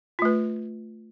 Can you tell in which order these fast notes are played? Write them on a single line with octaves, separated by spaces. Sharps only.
F4 A3 B4